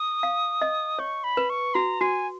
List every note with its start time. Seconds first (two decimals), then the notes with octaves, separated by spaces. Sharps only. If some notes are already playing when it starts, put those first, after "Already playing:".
Already playing: D#6
0.23 F5
0.62 D#5
0.99 C#5 C#6
1.24 B5
1.37 B4
1.50 C#6
1.74 F#4 A#5
2.01 F#4 G#5